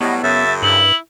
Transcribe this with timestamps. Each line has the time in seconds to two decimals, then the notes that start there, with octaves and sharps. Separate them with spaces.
0.01 A2 F#3 G3 B3 D#5
0.23 F#2 C#3 E5 A6
0.62 G2 E4 F#7